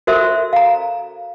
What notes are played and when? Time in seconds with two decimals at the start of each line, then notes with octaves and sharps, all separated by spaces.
0.07 F#4 A4 A#4 C5 E5
0.53 F5 A#5